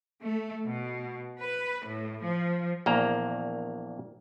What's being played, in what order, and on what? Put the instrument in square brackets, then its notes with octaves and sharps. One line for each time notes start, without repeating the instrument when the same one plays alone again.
[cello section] A3
B2
B4
A2
F3
[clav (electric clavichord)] A#1 E2 A#3 A#5